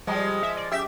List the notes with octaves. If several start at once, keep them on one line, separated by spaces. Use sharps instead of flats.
F3 G3 G#3
E5
D5
F#2 G4 E5